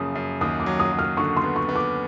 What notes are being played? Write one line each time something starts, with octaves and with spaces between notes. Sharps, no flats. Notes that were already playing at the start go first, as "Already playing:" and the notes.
Already playing: F#2 C#3 F3 A#3 D#6
F#2
D#2 D#6
D6
F#3
D#6
F#3
F6
D3 C#6
C6
B3
C#6
B3
D6